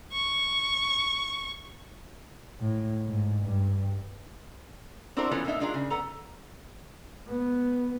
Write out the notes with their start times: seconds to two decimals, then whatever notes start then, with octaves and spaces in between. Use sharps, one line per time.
0.13 C#6
2.60 A2
3.06 G#2
3.44 G2
5.17 C4 D4 E4 F#4 A#4 C5
5.31 E3 B3 C#4 F4 A4
5.45 A2 A#3 D4 D#4 E5
5.60 G#3 D4 F4 G#4 A#4
5.74 C#3
5.90 B3 A4 A#5
7.29 B3